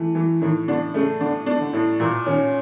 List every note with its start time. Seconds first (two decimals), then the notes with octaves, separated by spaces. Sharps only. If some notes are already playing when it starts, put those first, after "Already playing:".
Already playing: E3 A3
0.15 E3
0.41 A2 D#3
0.68 D3 D4
0.94 C#3 A3
1.21 D3 D4
1.46 D4
1.60 D3
1.73 A2
1.99 A#2 E3
2.26 D#3 C#4